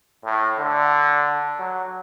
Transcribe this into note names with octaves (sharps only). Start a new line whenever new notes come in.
A2
D3
F#3